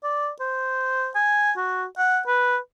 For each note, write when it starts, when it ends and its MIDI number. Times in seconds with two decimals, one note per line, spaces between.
0.03 0.30 74
0.40 1.09 72
1.15 1.51 80
1.57 1.85 66
1.98 2.20 78
2.27 2.57 71